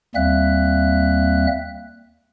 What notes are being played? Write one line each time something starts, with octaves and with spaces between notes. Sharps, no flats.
D#2 G3 A#3 C4 E5 F#6